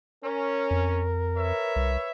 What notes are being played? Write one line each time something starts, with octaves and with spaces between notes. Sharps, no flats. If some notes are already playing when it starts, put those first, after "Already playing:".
C#4 A#4
F2
B4 C#5 E5
C2